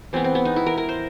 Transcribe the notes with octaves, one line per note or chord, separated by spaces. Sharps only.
E3 G#3 B3 C4
C4
B3
D#4
E4
A#4
A#4
C5